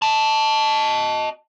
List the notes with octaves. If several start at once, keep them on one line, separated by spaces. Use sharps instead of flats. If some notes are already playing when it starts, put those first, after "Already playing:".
D#5 A5